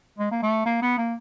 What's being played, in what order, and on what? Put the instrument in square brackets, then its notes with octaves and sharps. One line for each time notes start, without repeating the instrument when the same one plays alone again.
[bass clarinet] G#3
A#3
A3
A#3
B3
A#3